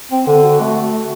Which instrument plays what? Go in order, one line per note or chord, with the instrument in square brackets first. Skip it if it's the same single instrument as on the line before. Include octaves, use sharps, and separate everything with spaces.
[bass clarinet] C4
D3
[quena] F#4
[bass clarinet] A3